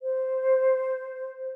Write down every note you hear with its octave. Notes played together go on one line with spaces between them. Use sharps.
C5